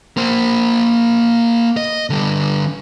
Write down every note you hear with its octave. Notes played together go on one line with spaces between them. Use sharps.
A#3 C5
D#5
D3 G3